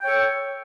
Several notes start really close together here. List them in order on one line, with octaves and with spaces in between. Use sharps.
G5 C#5 A4